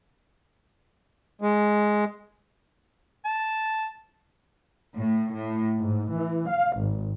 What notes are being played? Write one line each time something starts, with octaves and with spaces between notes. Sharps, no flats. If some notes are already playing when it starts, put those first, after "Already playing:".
G#3
A5
A2
A2
G#2
E3
F5
G#1